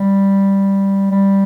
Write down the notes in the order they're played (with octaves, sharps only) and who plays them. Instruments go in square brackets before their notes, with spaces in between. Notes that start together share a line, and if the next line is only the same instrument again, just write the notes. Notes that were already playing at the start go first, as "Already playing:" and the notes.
Already playing: [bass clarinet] G3
G3